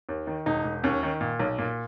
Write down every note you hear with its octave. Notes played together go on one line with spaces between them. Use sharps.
D#2
D#3
E1 D#4
E1
D#2 C#4
D#3
A#2
B1
A#2